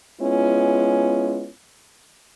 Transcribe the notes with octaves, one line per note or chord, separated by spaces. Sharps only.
G#3 B3 C#4 E4 F4